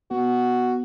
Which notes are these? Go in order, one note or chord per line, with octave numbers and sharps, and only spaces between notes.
B3 F#4